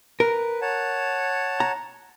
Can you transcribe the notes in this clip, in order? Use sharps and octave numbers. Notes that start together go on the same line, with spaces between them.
A#4 B4
C#5 F#5 A5
A#5